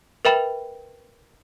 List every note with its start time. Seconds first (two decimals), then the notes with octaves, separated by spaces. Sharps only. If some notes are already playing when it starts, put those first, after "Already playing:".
0.25 A#4 B4 E5 G5 B5